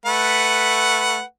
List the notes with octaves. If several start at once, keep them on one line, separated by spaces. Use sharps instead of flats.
A3 B4 F#5